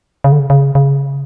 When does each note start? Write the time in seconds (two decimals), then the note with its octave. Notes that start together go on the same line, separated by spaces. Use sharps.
0.24 C#3
0.32 D3
0.39 C#3
0.50 C#3
0.75 C#3